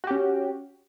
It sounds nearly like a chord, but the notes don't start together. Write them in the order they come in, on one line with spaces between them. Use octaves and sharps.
F#4 G4 C#4